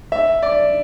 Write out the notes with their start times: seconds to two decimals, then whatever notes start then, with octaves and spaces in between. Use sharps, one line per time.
0.12 E5
0.43 D5